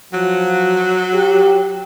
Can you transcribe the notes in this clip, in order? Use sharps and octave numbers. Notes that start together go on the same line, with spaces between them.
F3 F#3
G4